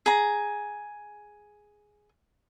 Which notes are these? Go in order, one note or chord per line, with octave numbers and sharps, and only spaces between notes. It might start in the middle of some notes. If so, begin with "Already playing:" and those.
G#4 A#5